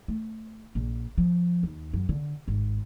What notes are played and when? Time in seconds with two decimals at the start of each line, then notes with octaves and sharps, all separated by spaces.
0.08 A3
0.75 A#1
1.18 F3
1.63 D#2
1.93 F#2
2.09 D3
2.48 G#1